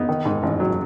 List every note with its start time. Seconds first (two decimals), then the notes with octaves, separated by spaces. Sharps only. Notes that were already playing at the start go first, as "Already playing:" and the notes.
Already playing: B3 D#4
0.09 D#3
0.25 G#2
0.43 A1
0.60 F#3